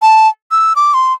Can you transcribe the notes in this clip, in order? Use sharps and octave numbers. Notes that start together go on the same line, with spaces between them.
A5
E6
D6
C6